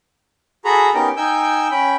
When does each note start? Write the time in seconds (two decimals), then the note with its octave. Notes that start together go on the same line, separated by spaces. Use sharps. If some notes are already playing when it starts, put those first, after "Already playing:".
0.65 F#4 G#4 A4 A#5 B5
0.94 B3 C#4 D#4 G4 A#4 G5
1.17 D#4 G5 G#5 E6 G6
1.71 C#4 G5 B5